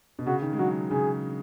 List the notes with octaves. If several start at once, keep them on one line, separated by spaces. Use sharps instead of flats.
B2
C#3 F#4
D#3
G#3
F#3 F#4
C#3 G#4